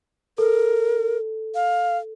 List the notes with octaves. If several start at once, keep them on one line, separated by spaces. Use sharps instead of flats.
A4 A#4
F5